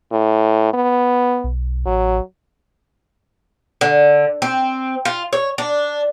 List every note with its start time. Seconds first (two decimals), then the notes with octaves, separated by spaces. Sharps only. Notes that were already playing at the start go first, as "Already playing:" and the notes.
0.12 A2
0.73 B3
1.44 B1
1.86 A1 F#3
3.81 D3
4.42 C4
5.05 F4
5.33 C#5
5.58 D4